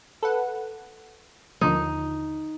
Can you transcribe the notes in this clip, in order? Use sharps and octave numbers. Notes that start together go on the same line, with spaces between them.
A4 B4 F#5
D#2 D3 F3 D#4